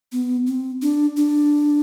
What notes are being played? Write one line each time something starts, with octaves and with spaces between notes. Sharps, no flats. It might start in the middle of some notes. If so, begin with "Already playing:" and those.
B3
C4
D4
D4